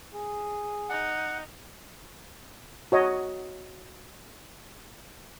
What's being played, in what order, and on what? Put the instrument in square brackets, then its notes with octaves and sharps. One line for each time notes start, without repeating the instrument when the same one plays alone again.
[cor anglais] G#4
[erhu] D#4 [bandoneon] F#5
[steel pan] F#4 C#5 D#5